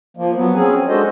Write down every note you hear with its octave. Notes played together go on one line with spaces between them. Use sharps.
F3 A#3
F#3 B3
C4 C#4 G#4 G#5
G#3 D4 F#4 A4 C5 D#5